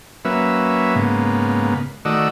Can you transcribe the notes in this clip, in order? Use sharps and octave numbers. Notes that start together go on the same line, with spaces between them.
F#3 A#3 C#4 B4 E5
G#2 C#3 A#3 B3
D#3 A3 F#4 D5 D#5 E6